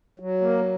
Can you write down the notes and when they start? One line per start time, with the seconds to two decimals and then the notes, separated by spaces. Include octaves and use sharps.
0.20 F#3
0.41 A#3